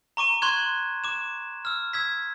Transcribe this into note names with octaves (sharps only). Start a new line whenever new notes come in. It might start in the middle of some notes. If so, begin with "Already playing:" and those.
A#5 C#6 D6 D#7
C6 C#6 F#6 G#6 E7
D6 E7
E6 F6
E6 G#6 B6